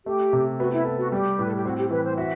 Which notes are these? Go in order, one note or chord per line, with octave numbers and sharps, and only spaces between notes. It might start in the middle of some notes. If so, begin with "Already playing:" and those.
A3 G4
C3
B3 F#4
E4
A4
F#4
G3 G4
A2 B4
A4
G4
C4 F#4
G4
A4
E3 B4
C5
F#4 E5